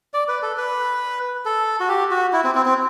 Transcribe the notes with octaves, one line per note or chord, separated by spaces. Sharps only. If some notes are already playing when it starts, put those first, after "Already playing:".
D5
B4
A4
B4
A4
F#4
G4
F#4
E4
C4
C4
C4